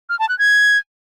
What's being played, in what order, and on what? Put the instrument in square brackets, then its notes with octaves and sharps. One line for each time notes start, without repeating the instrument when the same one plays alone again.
[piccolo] F6
A5
F#6
G#6